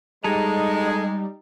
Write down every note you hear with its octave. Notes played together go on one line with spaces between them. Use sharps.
G3 G#3 D#4 A4 D#5 A#5